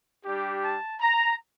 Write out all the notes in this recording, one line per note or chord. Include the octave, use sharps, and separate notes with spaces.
G3 D4 G4
A5
A#5